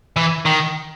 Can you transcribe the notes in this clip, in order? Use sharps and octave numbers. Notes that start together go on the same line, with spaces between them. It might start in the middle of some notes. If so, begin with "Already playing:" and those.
E3
D#3